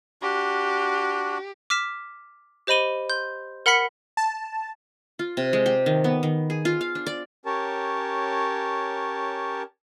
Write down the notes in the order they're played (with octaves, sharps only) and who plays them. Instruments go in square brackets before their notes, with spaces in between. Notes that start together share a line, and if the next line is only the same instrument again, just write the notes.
[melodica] D4 F#4 [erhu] G4
[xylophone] D6 F6 B6 E7
G4 C5 D#5 B5 D#7 G7
C6 G6
A#4 F#5 B5 F6 B6 C#7
[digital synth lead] A5
[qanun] F4
C3
G#3
G4
D#3
B3
D#3
G#4
F4
F5
D4
D5
[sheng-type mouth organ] C#4 G4 A#4 C#5 A5